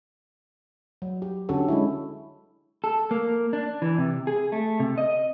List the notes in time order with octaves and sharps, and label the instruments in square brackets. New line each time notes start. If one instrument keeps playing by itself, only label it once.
[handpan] F#3
G4
D3 C#4 F#4 G4 A4
G#3 C#4 E4
[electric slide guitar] A4
A#3
D4
E3
C3
G#4
A3
C3
D#5